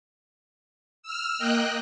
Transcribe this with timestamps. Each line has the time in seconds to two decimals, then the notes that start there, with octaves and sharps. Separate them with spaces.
1.03 E6 F6
1.39 A#3 D#5 G5 F#6